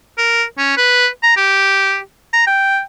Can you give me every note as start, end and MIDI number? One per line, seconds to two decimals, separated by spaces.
0.18 0.43 70
0.58 0.75 61
0.77 1.07 71
1.23 1.36 82
1.36 1.99 67
2.33 2.45 82
2.47 2.80 79